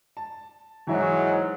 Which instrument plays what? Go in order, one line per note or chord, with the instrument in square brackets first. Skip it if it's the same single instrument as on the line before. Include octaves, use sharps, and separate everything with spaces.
[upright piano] A5
[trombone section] G#2 F#3 [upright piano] E3 E4